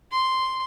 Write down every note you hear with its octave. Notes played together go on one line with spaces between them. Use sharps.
C6